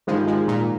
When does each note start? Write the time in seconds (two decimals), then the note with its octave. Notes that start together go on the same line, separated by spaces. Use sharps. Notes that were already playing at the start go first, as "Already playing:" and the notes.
0.07 G#2 D#3 F3 G3 G#3
0.27 F3 G#3
0.48 A#2